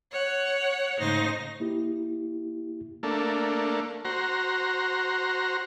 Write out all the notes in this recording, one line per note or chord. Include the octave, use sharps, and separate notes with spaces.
C#5 F#5
G#2 C#3 A3 D#4 C5 A#6
A#3 E4 G4
A3 A#3 D4
F#4 C5 A#5